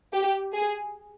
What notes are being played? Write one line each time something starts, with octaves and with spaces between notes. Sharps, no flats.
G4
G#4